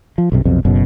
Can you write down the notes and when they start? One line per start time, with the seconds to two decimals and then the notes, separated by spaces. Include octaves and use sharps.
0.18 F3
0.32 B1 G2 C3
0.45 B1 F2 C3
0.65 F#1 F#2 B2